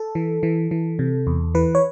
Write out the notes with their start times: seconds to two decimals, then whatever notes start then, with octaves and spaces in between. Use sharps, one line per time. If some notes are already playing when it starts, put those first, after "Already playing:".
Already playing: A4
0.15 E3
0.43 E3
0.71 E3
0.99 C3
1.27 E2
1.55 E3 B4
1.75 C#5